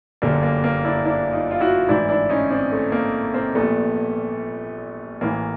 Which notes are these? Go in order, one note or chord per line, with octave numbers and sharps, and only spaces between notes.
G1 F#2 D3 G3 A#3
A#3
A#3
D4 E4
D4 E4
D#4 F4
F4
E4 F#4
A1 G#2 E3 D4 E4
D4 E4
C#4 D#4
C4 D4
A3
A#3
A#3 C4
A#1 A#2 G3 A3 B3
A1 A2 E3 A#3